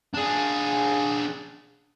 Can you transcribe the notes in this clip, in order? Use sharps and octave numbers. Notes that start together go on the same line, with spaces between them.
D4 G#4